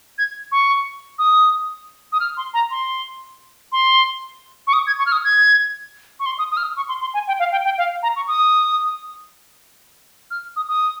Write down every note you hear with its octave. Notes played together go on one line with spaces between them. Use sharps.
G#6
C#6
D#6
D#6
F6
C6
A#5
C6
C6
C#6
D#6
G#6
C#6
F6
D#6
G#6
C#6
C6
D#6
D#6
F6
D#6
C#6
C6
C6
G#5
G5
F5
G5
G5
F5
A#5
C#6
D#6
F6
D#6
D#6